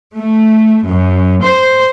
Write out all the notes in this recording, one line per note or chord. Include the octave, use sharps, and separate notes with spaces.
A3
F#2
C5